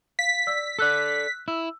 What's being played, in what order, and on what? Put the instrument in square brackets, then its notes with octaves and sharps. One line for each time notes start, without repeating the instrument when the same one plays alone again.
[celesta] F5 [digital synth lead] B6
[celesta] D5 E6
[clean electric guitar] A4 D5 [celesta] E6 F#6
[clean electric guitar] E4 [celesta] E6